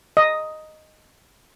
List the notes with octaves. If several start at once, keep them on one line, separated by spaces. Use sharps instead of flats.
D#5